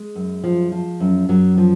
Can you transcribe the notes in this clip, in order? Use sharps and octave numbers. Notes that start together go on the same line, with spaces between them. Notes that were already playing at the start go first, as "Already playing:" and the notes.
Already playing: G#3
F#2
F3
F3
F#2
F#2 F#3
F3